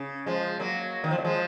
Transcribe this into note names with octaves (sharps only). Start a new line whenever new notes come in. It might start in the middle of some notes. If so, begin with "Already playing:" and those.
Already playing: C#3
F3 G#3
F#3 A#3
D#3
F3
F#3
F3 G#3